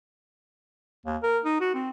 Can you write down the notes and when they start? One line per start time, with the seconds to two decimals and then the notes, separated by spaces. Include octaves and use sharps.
1.06 D#2
1.23 A#4
1.45 D#4
1.60 F#4
1.74 C4